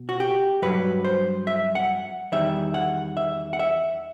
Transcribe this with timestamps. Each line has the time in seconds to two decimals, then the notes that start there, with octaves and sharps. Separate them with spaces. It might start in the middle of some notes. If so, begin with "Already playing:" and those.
Already playing: B2
0.09 F#4
0.20 G4
0.62 G2 F#3 B4
1.04 C5
1.47 E5
1.75 F#5
2.32 E2 D#3 G3 E5
2.74 F#5
3.17 E5
3.53 F#5
3.59 E5